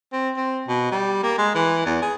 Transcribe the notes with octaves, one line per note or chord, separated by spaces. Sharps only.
C4
C4
B2
G3
A#3
G#3
E3
E2
G#4